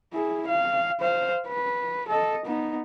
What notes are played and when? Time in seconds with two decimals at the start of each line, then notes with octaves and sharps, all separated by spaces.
0.13 E4 G#4
0.48 F5
1.01 C5 F5
1.48 B4
2.09 A4 D#5
2.46 B3 D#4